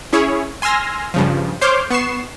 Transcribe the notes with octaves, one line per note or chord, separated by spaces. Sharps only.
C#4 E4 G#4 C#5
G#5 C6 E6 F6 A#6
G2 C#3 F3
C5 C#5 C6 D6 F6 G6
B3 C#6 C7 E7